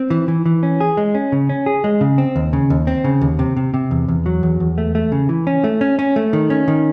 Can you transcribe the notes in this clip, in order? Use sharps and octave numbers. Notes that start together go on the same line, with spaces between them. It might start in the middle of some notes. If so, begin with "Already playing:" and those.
Already playing: C4
E3
E3
E3
C#4
G#4
G#3
C#4
C#3
C#4
G#4
G#3
C#3
C4
D#2
C#3
D#2
C4
C#3
D#2
C3
C3
C3
E2
E2
F#3
E2
E2
A3
A3
C#3
E3
C#4
A3
C#4
C#4
A3
D#3
C#4
D#3